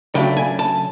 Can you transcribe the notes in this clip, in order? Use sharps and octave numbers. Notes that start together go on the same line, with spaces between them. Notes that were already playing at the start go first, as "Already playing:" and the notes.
C#3 F#3 A3 D4 G5
G#5
A5